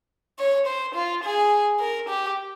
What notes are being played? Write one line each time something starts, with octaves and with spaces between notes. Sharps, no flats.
C#5
C5
F4
G#4
A#4
G4